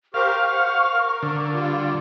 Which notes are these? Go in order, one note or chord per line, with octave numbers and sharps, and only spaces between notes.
G4 A#4 C5 F5 C#6
C5 F#5
A#4
D3
G3 F4